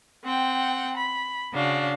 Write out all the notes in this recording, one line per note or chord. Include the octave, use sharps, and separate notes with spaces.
C4 F#5 G5
B5
C#3 D4 F#4 F5